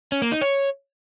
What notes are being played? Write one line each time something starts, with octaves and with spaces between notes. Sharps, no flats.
C#4
A#3
D#4
C#5